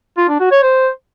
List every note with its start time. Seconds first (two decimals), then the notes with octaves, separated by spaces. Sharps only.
0.17 F4
0.29 D4
0.40 F#4
0.52 C#5
0.63 C5